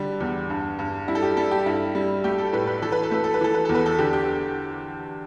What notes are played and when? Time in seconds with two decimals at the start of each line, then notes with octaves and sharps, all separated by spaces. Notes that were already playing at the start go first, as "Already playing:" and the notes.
Already playing: D3 G3
0.20 E2
0.50 G2
0.79 G2
1.08 G3 E4
1.15 A4
1.23 G4
1.37 G3 A4
1.51 G4
1.66 G2 E4
1.95 G3
2.24 A3 G4
2.38 A4
2.53 A2 B4
2.67 B4
2.82 E3 A4
2.92 B4
3.03 A4
3.11 A3 B4
3.24 A4
3.34 B4
3.41 E3 A4
3.54 B4
3.65 E2 A4
3.75 B4
3.86 A4
3.99 D3 G4
4.13 G4